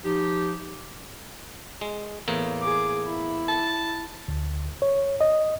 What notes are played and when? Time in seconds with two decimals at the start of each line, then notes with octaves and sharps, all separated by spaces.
0.04 F3 D#4 G4
1.81 G#3
2.28 E2 A2 A#3
2.62 G#4 D6
3.05 E4
3.49 A5
4.28 D2
4.82 C#5
5.21 D#5